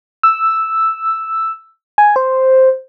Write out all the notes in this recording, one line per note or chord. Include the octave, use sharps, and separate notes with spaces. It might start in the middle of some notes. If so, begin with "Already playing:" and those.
E6
G#5
C5